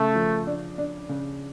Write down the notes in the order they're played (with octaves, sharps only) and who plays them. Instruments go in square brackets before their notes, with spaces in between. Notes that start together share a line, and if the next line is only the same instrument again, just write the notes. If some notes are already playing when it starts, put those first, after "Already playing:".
Already playing: [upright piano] C#3 [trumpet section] A3
[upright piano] F3
D4
D4
C#3